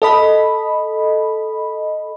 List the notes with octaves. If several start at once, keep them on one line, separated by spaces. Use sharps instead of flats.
A4 D#5 B5